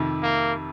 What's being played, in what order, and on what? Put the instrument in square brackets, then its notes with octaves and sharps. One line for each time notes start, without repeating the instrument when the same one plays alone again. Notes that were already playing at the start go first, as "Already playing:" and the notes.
Already playing: [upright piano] F2 C3 D#3
[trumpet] A#3